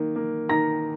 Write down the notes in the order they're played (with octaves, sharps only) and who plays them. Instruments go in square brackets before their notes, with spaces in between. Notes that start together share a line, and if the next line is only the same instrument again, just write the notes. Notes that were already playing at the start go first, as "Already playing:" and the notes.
Already playing: [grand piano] D#3 A#3
A#3
D#3 A#5 A#6